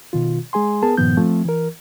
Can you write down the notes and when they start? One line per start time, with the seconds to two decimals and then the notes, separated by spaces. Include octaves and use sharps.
0.13 B2 D#3 F4
0.53 G#3 G#4 G#5 C6
0.83 B3 G#4 A#4 A5
0.97 G2 A#2 D#3 F3 B3 G6
1.17 F3 A3 C4
1.45 E3 A#4